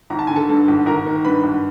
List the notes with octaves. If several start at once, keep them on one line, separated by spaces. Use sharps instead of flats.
G#1 A#5
A5
D3 G#5
A4 A5
G2
G#1
G#1 A#4 A#5
D#3
G2 B4 B5
G#1